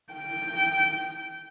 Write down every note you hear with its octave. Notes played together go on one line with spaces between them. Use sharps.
G5